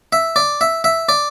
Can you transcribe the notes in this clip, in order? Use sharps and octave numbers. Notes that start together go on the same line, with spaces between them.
E5
D5
E5
E5
D5